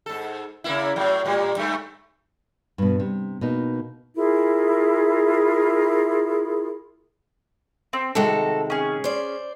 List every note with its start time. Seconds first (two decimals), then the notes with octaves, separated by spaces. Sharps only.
0.06 G#2 A4
0.64 C#3 A#3 E4
0.96 A2 F#3
1.25 A2 G3 A#3
1.57 G2 A3
2.78 G2 B2
3.00 C3
3.41 B2 A#3 D#4
4.15 E4 F4 G#4 A#4
7.93 C4
8.15 C3 D#3 G#3 F#4 A4
8.70 C#4 G#4
9.04 C5 D5